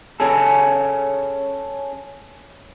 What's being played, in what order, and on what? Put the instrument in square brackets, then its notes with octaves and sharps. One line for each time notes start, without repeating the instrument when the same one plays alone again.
[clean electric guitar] C#4 G#4 A4